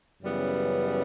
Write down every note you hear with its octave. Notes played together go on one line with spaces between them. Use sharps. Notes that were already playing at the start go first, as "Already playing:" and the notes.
F#2 C#3 E3 G3 B3